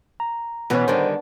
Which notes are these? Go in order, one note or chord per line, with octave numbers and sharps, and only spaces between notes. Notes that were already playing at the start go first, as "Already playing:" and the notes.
A#5
B2 E3 F#3 B3 C#4
D3 D#3 G3 D4 C5